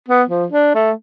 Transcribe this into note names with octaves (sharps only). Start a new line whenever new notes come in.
B3
F3
D4
A3